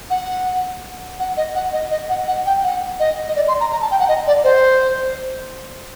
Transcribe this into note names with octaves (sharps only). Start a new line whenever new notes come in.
F#5
F#5
D#5
F#5
D#5
D#5
F#5
F#5
G5
F#5
D#5
D#5
D5
C6
A#5
A#5
A5
G5
F#5
D#5
D5
C5